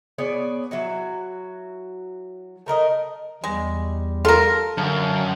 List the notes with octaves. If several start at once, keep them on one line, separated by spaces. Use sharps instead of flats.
B3 G#4 C#5 D5
F#3 E4 F#4
A3 A#4 D5 D#5
E2 G3 G#3
F4 A4 A#4
F#2 D3 F5 A5